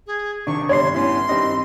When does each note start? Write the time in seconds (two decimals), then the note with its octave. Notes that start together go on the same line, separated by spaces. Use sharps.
0.07 G#4
0.47 C3 D#3 D4 C#6
0.69 G1 G2 C#5 D5 C6 C7
0.95 B3 C#4 E4 C6
1.29 G2 D#3 C4 D#5